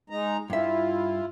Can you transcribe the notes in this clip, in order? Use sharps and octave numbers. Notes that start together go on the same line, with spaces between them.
G#3 D#4 A#5
G2 E4 F4 E5